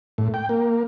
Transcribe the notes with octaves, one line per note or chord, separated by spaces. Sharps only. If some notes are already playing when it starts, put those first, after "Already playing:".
A2
G5
A#3